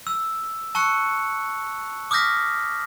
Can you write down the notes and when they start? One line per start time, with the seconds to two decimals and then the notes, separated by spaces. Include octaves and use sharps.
0.07 E6
0.75 A5 C#6 E6 F#6 C#7
2.11 D6 D#6 F6 G6 A#6 B6